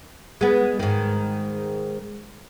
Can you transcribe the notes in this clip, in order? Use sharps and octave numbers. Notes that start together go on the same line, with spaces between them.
G#3 B3
G#2 D#3